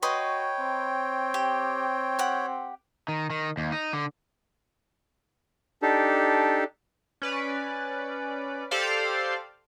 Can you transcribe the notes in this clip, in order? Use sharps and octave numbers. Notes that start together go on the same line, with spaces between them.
F#4 B4 C#5 D#5 G5 C6
C4
G4
G4 F#5
D#3
D#3
D#2
D#4
D3
D4 D#4 G4 A4
C#4 B4 D5
G4 A4 C5 D5 F5